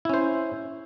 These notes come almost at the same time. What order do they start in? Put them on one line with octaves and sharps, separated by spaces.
E4 C#4 C5